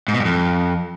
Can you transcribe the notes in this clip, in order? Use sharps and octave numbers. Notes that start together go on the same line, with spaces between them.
G#2
B2
G2
F2